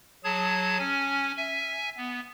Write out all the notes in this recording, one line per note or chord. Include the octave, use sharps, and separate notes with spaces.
F#3 G#4 A5 G#6
C#4 G#5
E5 G#5
B3